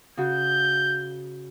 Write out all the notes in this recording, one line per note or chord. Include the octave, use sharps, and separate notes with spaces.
C#3 F#4 G6